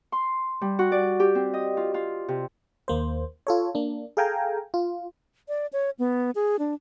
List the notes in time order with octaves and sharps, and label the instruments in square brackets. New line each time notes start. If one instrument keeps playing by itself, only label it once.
[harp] C6
G3
F#4
D5
G4
C4
D#5
F4
F4
C3
[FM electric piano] D#2 A#3 C5
F4 A4 C#5
A#3 D4
G#4 A4 F5 G5 G#5 A#5
F4
[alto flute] D5
C#5
B3
G#4
D4